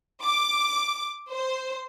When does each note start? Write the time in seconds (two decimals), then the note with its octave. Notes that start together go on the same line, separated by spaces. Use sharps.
0.22 D6
1.30 C5